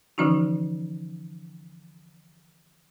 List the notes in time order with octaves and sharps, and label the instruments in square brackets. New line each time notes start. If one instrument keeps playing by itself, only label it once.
[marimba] D3 E3 F3 C#4 D#4 F#4